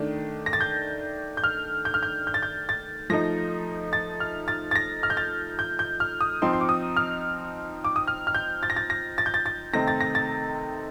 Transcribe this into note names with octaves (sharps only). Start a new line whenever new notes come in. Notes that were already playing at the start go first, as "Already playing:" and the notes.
Already playing: D#3 A3 D4
A#6
A6
G6
G6
F6
G6
F6
G6
G6
A6
G6
A6
F3 A3 D#4 A#6
A6
F6
A6
A6
A#6
F6
G6
A6
G6
G6
F6
D#6
F3 C4 D#4 C6
C6
D6
D#6
F6
D6
D#6
F6
F6
G6
A6
A#6
A6
A#6
A6
G6
A6
A6
C3 D#3 A3 C4 D#4 A#6
A6
A#6
A6